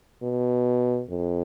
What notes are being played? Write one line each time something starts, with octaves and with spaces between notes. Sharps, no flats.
B2
F2